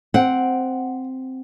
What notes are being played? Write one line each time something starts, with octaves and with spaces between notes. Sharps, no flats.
C4 F#5 D7